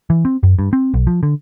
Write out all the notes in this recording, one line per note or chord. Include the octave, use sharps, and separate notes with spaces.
E3
C4
F#2
G2
C4
B1
F3
D3